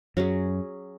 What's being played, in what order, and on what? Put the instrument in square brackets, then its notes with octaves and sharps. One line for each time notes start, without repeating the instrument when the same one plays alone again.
[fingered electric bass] F#2 [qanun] F#3 C#4 G#4